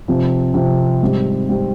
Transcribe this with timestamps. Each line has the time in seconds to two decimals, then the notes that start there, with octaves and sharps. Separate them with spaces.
0.08 C3 F3 C4
0.54 C3 F3 C4
1.02 G#2 G3 C4 G4
1.48 G#2 G3 C4 G4